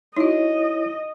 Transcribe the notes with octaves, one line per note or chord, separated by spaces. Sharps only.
D#4 E4 F#4 C#5 D#5